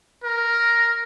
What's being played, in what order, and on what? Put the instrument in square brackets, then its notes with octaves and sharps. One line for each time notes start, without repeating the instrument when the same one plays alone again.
[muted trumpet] A#4